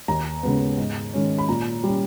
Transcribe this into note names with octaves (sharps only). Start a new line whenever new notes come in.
D#2 A#5
C#3 G#3 B3
G#2
D#3 G#3 C#4
B5
A#2 A#5
G3 C#4